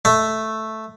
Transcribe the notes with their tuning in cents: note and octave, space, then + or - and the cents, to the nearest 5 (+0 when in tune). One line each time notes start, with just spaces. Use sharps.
A3 +0 E5 +0